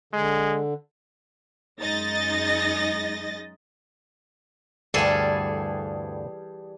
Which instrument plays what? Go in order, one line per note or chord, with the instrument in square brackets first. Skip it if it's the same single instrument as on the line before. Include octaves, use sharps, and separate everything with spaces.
[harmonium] D3 [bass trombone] G#3
[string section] F#2 G#3 D#4 D#5 A6 A#6
[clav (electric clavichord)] D2 G2 [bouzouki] E3 G3 [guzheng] G#4 A4